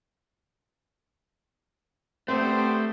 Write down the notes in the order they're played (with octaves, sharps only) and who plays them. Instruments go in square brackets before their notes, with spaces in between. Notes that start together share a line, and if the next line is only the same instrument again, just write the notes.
[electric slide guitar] A3 [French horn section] B3 D4 G4 [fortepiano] C4 [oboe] C5